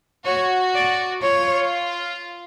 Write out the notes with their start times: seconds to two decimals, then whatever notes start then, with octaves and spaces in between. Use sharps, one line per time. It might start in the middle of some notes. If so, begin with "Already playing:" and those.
0.25 F#4 C#5
0.75 D5
1.23 F4 C#5